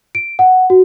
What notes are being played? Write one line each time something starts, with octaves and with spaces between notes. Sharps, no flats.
D7
F#5
F#4